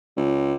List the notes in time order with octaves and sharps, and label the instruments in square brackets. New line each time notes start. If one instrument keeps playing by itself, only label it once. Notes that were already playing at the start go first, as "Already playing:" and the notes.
[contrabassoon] C#2